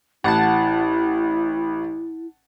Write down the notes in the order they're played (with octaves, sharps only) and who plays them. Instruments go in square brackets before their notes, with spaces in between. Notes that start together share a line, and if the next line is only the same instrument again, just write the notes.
[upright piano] A1 [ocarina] E4 [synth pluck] F#5 A5